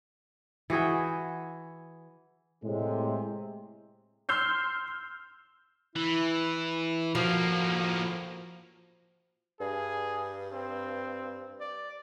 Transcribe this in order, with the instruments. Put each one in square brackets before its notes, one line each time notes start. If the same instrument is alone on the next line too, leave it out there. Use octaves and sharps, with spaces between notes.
[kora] E3 F#4 G#4 G5
[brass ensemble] A2 C3 G#3
[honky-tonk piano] C6 E6 F6 G6 C7
[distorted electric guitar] E3 [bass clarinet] E4
[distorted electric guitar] A2 A#3 [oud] F3 [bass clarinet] F#4
[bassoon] G2 [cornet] G#4
[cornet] C4
D5